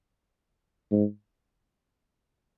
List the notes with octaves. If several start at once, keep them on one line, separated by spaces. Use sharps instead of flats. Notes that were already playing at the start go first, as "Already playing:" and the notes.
G#2